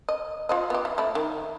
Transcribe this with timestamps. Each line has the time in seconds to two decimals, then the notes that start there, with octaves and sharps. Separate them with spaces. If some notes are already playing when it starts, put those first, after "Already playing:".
0.09 D#5
0.49 F4 C5 D#5
0.70 B3 G4
0.85 E3
0.98 A3 E4
1.15 D#3